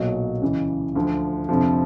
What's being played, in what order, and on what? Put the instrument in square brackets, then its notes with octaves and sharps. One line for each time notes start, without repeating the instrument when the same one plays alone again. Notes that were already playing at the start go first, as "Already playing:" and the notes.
Already playing: [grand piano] B1 A#2 F#3 D#5
C#2 C#3 E3
D2 D3 F3
F1 F2 D3 F3